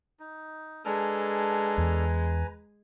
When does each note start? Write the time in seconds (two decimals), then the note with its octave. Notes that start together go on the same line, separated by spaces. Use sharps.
0.20 D#4
0.85 G#3 D4 A4 B4 G#5 A#5 F6
1.78 E2